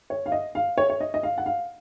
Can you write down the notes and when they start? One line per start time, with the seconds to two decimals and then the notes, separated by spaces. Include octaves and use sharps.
0.10 C#5
0.26 F5
0.32 D#5
0.55 F5
0.78 C#5
0.90 C#5
1.00 D#5
1.14 D#5
1.23 F5
1.38 F#5
1.46 F5